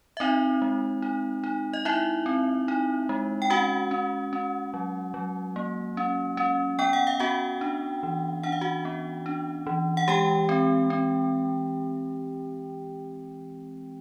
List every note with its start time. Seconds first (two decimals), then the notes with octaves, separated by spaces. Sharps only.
0.17 E5
0.20 C4 D#4 D#5
0.62 G#3
1.02 D#4
1.44 D#4
1.73 D#5
1.85 D#4 E4 E5
2.26 C4
2.68 D#4
3.09 G#3
3.42 G5
3.50 C#4 F#4 F#5
3.91 C#4
4.33 C#4
4.74 F#3
5.14 F#3
5.56 A#3
5.97 C#4
6.37 C#4
6.79 B3 G5
6.93 F#5
7.07 F5
7.20 B3 F#4 F#5
7.61 D4
8.03 E3
8.43 D4 F#5
8.52 F5
8.61 F#4 F#5
8.85 B3
9.26 D4
9.67 E3
9.97 F#5
10.08 G#3 G4 G5
10.49 C4
10.90 C4